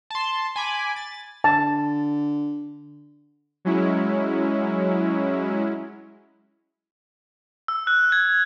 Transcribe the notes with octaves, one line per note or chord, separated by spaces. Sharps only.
A5 C6
G#5 B5 D6
A6
D3 A5
F#3 G#3 C#4 E4
E6
F#6
G#6